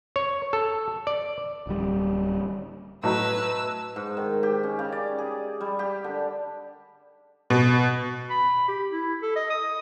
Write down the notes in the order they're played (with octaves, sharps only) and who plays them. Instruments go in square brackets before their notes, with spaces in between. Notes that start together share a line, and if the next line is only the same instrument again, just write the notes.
[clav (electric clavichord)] C#5
A4
D5
[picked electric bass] D1 G3
[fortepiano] A2 F#3 D#4 [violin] B4 E6
[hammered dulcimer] G#2
D#3
G4
C#4
C#3
D5
G#4
G3
G4
D3
[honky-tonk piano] B2
[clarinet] B5
G4
E4
A4
D#5
D#6